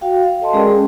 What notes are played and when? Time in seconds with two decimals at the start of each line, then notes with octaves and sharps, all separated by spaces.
0.01 F#4 F5 G5
0.23 F5
0.41 A4 D#5 A5 C6
0.53 G#3 C#4 G#4 A#4 D5 G5